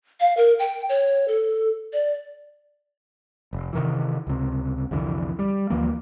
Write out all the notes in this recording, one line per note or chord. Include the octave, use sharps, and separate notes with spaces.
F5
A#4
G5
C#5
A4
D5
F1
C3 D#3 E3
C#2 C3
C2 F2 D3 E3
G3
D2 E3 F3 A#3